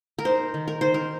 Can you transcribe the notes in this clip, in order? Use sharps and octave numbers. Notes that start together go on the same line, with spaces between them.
A#4
D#4 C5
D#3
A#4
D#3 C5
A#4